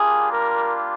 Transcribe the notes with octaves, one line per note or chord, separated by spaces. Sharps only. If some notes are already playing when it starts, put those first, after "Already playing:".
Already playing: G3 A#3 D4 F4 G#4
A#4